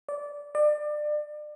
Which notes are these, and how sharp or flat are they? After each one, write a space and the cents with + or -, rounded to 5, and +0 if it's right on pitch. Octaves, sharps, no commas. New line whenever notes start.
D5 -15
D5 +30